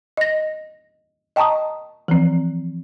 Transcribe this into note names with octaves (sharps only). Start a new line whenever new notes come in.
D#5 A#6
D#5 G5 A5 A#5 C#6 D#6
E3 F3 C4